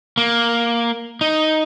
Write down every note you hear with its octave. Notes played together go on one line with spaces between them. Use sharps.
A#3
D#4